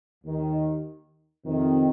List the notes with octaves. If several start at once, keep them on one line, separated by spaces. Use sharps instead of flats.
D#2 D#3
F2 C3 D#3